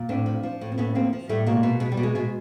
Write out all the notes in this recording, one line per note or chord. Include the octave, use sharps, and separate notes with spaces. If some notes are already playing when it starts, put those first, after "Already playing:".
Already playing: A#2
A2 C4 D4
F3
F3
A2
C4
A2 B3 C#4
F3 A#3 C4
F3
A2 G3 A3
B2 G#3 A#3
B2
B2 G#3
G3
B2
G#3
B2 G#3